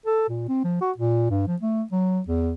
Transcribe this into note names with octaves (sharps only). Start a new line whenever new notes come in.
A4
A#2
C4
F3
F#4
A#2
G2
F3
A3
F#3
E2